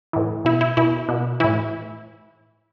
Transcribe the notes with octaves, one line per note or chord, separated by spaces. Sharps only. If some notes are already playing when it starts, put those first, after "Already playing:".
A2 E3
B2 E4
E4
B2 E4
B2
A2 E3 E4